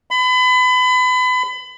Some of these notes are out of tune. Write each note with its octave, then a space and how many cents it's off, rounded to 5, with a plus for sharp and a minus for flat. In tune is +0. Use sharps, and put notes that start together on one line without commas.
B5 +30